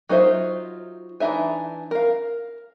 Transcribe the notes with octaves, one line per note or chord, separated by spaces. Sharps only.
F#3 D#4 F4 C5 E5
E3 D4 D#4 E5 G#5
A#4 F5